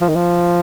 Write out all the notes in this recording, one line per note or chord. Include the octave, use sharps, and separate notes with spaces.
F3
D#3
F3